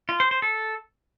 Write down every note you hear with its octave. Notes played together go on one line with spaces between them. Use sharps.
F4
C5
C5
A4